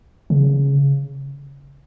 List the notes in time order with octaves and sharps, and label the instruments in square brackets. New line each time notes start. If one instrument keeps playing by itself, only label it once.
[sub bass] C#3